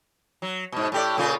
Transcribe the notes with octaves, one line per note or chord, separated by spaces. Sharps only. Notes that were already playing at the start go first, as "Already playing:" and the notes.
F#3
G#2 B2
A2 G4 D5
A#2 C#3 F4